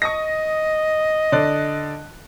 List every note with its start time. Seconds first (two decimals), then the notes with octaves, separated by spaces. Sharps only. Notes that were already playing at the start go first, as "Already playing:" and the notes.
0.02 D#5 C#6 D#6 A#6
1.32 D3 D5 F#6